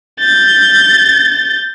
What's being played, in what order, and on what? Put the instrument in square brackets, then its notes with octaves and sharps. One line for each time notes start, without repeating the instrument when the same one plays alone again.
[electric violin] G6 A6